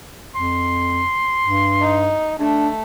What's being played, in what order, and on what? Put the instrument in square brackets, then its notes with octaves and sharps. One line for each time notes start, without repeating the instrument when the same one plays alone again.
[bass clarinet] F2 [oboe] C6
[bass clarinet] G2
[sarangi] D#4
[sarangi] A3 [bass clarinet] D4